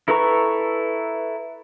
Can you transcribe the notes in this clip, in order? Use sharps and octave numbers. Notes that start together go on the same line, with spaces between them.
E4 A4 B4 A#5 C#6